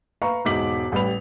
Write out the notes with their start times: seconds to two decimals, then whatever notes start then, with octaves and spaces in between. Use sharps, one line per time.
0.22 B4 F5 A#5 C#6
0.45 E1 G#2 D#4 D6 B6 F#7
0.92 A1 G3 G4 B4 B5 F7